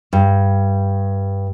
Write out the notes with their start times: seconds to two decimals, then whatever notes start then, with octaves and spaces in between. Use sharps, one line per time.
0.13 G2